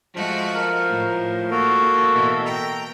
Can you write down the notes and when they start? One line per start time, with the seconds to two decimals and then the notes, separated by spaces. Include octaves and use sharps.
0.15 F3 G#3 A3 F#4
0.55 A#4
0.87 A2
1.51 A#3 F#4 A4
2.13 B2 E3
2.45 G5 A#5